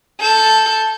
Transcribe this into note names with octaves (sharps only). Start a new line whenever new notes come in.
A4 G6